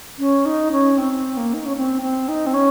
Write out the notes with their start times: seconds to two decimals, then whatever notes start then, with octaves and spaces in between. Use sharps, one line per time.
0.19 C#4
0.46 D#4
0.72 C#4
0.98 C4
1.37 A#3
1.54 D#4
1.66 C#4
1.77 C4
2.02 C4
2.28 D#4
2.46 C4
2.54 C#4